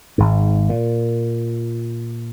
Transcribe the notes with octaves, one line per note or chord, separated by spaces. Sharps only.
G#1 G#2
A#2